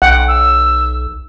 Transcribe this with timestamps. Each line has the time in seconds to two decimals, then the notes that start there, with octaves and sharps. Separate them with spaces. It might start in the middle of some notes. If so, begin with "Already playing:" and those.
0.02 B1 F#5 G5
0.28 E6